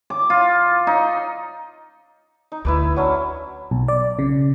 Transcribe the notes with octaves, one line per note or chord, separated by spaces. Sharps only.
D6
F4
D#4
D#4
D2 E4 B4 D5
F#3 C#4 D4
B1
D5
C#3